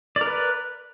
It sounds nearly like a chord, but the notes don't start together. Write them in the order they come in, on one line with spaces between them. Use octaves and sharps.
D5 A#4 B4